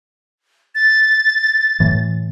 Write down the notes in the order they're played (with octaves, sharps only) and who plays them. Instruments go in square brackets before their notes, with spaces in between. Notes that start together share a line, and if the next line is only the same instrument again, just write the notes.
[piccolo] A6
[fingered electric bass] A2 E3